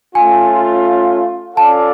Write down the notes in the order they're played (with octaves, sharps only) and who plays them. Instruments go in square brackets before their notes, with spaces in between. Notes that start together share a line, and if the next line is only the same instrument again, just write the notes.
[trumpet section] A3 C#4 F4 [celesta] G#5
[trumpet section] C#4 F4 A4 D5 F5 [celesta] A5